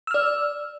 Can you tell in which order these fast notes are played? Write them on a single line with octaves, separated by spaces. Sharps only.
E6 F6 D5